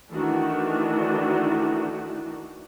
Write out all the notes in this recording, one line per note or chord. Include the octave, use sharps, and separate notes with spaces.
D#3 E3 A3 D4 F#4